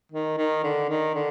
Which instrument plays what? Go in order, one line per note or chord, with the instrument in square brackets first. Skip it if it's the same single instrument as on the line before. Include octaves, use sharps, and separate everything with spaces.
[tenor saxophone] D#3
D#3
D3
D#3
D3